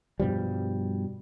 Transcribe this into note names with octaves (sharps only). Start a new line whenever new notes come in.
G2 B2 F3 G3